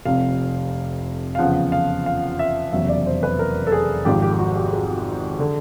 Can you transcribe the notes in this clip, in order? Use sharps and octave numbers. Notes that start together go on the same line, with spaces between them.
F1 F2 C3 F5
F5
E2 C#3 F3 F#5
F5
F5
E5
F1 E2 C#3 F#3 E5
D5
C5
B4
A#4
A4
G#4
G#1 G#2 F3 G4
G4
G4
F#4
G4
G#4
D3